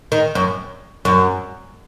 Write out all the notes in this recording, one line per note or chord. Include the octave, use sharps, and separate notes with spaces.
D#3
F#2
F#2